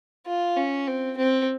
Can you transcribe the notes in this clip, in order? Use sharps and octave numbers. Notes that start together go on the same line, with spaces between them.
F4
C#4
C4
C4